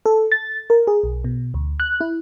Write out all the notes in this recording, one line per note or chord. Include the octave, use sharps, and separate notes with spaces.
A4
A6
A#4
G#4
B1
B2
D2
F#6
E4